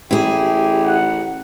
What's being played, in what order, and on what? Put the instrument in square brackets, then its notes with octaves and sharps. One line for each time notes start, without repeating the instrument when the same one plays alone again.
[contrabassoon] A1 [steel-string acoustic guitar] E4 G#4 [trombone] G4
[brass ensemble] F#5